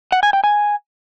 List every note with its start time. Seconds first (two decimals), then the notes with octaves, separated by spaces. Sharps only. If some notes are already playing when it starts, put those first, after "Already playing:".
0.12 F#5
0.23 G#5
0.33 G5
0.44 G#5